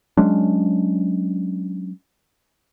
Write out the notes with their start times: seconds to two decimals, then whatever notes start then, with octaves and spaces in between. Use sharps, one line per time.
0.17 F#3 G#3 C#4 D4